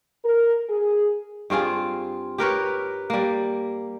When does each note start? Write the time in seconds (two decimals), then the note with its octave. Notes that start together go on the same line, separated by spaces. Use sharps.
0.24 A#4
0.70 G#4
1.50 G2 C4 F4 G#4
2.38 G4 A#4 B4 C#5
3.10 G3 A#3